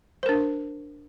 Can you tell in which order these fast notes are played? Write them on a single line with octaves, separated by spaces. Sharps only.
C5 A#4 D4